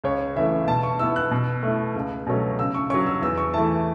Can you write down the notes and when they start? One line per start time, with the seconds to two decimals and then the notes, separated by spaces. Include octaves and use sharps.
0.04 C#2 C#5
0.36 C#3 E3 A3 E5
0.67 B2 A5
0.83 C#6
0.99 B3 E4 E6
1.16 F#6
1.31 B2
1.63 A3 E4
1.96 C#2
2.26 B2 F#3 A3 C#4
2.59 C#3 E6
2.74 C#6
2.90 F#3 C#4 C#6
3.06 E6
3.22 E2 E6
3.38 C#6
3.53 E3 A3 E4 A5